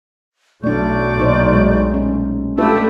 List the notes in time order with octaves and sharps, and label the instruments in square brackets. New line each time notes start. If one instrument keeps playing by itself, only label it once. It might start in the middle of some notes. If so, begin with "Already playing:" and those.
[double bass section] B1 [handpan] A3 D4 [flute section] D5 C#6 G6
[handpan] A#2 D#4 C5
G#3
C#4
[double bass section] A3 [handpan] D4 F4 B4 [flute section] G4 A5 E6